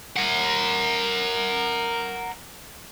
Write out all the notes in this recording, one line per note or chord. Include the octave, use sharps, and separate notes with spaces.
A#4 F#5